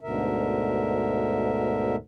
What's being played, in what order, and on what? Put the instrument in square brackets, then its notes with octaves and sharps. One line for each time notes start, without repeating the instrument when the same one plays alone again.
[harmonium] D2 G#2 B2 D3 A#4 E5